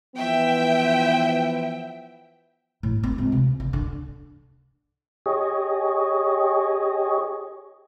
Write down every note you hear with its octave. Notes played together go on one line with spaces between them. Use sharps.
E3 F3 B3 E5 G5
A2
C4
C#2
C3
D3
D3
G4 G#4 C#5 D#5